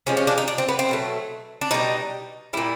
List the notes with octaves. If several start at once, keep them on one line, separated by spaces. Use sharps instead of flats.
C3 F3 G#3 C#4
C#4
D4
D#4
D4
C4
B3
C4
B2 F#3 A3
D4
B2 G3 D#4
A#2 G3 E4